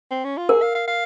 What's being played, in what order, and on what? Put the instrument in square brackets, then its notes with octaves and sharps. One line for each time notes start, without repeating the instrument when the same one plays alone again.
[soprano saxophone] C4
C#4
F4
[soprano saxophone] G#4 [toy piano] A#4
[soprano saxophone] F5
F5
F5